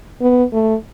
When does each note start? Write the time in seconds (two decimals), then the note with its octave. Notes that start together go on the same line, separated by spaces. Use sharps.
0.21 B3
0.53 A3